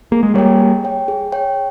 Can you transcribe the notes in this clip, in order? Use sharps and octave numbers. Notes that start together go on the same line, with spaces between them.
A#3 G#4
G#3
G3 A#3 C#5 G5
G#4
C#5 G5
G#4
C#5 G5